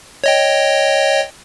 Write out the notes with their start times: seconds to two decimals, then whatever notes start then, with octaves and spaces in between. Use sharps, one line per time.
0.24 C#5 D#5 G5